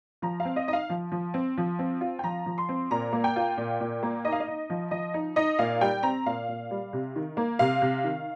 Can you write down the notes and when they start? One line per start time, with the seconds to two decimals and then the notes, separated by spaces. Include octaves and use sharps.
0.22 F3 A#5
0.40 F5
0.45 C4
0.56 D#5
0.67 D#4 D#5
0.73 F5
0.90 F3
1.12 F3
1.34 C4
1.57 F3
1.79 C4
2.01 F4
2.19 G5
2.23 F3 A#5
2.46 F3
2.58 C6
2.69 C4
2.91 A#2 A#5
3.13 A#3
3.24 G5
3.36 F4
3.57 A#2
3.80 A#2
4.03 A#3
4.25 D#4 D#5
4.32 F5
4.40 D#5
4.48 D#4
4.70 F3
4.91 F3 D#5
5.14 D#4
5.36 D#4 D#5
5.59 A#2 F5
5.81 G3 G5
6.03 C4 A#5
6.26 A#2 F5
6.49 A#2
6.71 G3
6.93 C3
7.16 D#3
7.37 A#3
7.59 C3 F5
7.82 C3
8.04 D#3